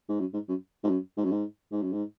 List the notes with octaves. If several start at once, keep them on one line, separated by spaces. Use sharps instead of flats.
G#2
F#2
G#2
F#2
G#2
F#2
G#2
F#2
G#2
G#2
F#2
G#2